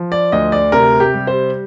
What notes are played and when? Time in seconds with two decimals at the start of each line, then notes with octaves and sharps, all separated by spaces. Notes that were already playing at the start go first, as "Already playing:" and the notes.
Already playing: F3
0.12 D5
0.32 D2 D#5
0.52 D5
0.72 C3 A#4
1.00 G4
1.14 G3
1.27 C5